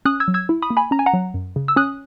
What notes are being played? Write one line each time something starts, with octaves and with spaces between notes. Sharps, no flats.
C#4 D#6 F#6
E6 G#6
F#3
E6 G#6
E4
B5 D#6
A#3
G#5 B5
C#4 A#5
G#5
F#5 A#5
F#3
F#2
C#3
E6
C#4 D#6 F#6